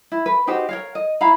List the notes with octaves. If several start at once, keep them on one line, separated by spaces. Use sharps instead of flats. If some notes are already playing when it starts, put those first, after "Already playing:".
E4
B4
D#4 F#4 G4 C5
A#4 C#5 F5
D#5
E4 F5 A#5 B5